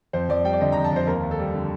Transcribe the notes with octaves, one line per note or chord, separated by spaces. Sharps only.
F2 C5
F2 D5
G3 G5
D5
D3 D#5
F2 A#5
A5
F2 C5
D#2 A#4
D#2
A4
G3
D3